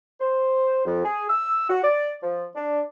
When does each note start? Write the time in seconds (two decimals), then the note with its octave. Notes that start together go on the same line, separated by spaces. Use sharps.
0.20 C5
0.85 F2
1.04 G#4
1.29 E6
1.69 F#4
1.84 D5
2.22 F3
2.55 D4